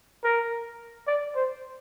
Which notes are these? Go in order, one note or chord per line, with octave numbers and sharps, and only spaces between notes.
A#4
D5
C5